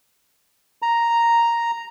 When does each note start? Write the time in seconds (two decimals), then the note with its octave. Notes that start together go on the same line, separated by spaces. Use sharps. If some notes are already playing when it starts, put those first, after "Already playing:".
0.82 A#5